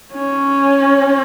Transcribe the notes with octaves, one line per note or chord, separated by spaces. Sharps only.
C#4